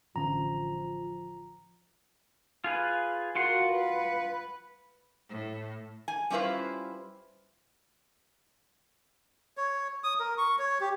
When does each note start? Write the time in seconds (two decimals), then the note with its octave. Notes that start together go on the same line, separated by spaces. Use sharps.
0.16 A1 D3 F3 C#4 A#5
2.64 F4 G#4 B4
3.35 F4 F#4 A#4 F#5 C6
3.72 B4
5.29 A2
6.08 G#5
6.30 G3 C#4 E4 F4 B4 C5
9.57 C#5
10.04 D#6
10.20 A#4
10.38 C#6
10.59 C#5
10.80 G4